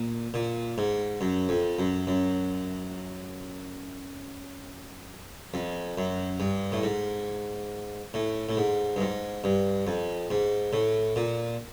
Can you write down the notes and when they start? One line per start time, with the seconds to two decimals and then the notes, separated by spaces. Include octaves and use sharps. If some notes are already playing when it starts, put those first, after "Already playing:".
Already playing: A#2
0.34 A#2
0.78 G#2
1.21 F#2
1.49 F2
1.79 F#2
2.07 F#2
5.54 F2
5.98 F#2
6.40 G2
6.72 A2
6.83 G#2
8.14 A2
8.49 A2
8.57 G#2
8.96 G2
9.01 G#2
9.44 G2
9.87 F2
10.31 G#2
10.73 A2
11.16 A#2